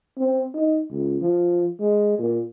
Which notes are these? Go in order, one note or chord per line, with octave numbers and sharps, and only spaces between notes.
C4
D#4
C#2
F3
G#3
A#2